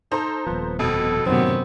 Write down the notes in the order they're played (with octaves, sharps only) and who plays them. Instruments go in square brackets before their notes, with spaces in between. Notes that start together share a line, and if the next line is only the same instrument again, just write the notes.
[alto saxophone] D#4 [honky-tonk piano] A4 C5 A#5
[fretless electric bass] D#1 F3 [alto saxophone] B3
[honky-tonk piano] F2 B2 [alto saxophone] A4
[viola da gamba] F#2 C3 B3 [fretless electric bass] A2 D#3 F#3 [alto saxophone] C4